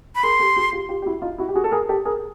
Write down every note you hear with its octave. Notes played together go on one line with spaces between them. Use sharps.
B5
G#4 A#4 C6
G4 A4
F#4 G#4
F4 G4
F4 G4
G4
E4 F#4
D#4 F4
E4 F#4
G4
F#4 G#4
A4
G#4 A#4
G4 A4
G#4 A#4